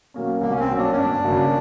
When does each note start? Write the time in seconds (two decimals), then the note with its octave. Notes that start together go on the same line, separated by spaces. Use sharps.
0.14 B2 F#3 A#3 C#4
0.41 C2 A#3
0.51 C#4
0.60 C4
0.68 B2 F#3 A#3 C#4
0.78 D4
0.92 C#4
0.97 G1 D4
1.24 F#2 C#3 F#3 A#3